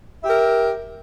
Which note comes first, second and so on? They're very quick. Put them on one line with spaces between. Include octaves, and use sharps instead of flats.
E5 G4 A#4